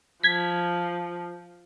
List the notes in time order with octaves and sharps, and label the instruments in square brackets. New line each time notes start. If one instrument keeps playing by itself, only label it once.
[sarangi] F3 [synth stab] G#6 B6